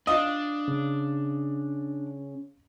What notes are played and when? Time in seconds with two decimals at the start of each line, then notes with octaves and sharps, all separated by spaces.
0.07 D4 F4 D#5
0.68 C#3